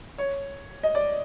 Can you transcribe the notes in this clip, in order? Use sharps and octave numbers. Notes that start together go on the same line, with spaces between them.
C#5
D#5
D5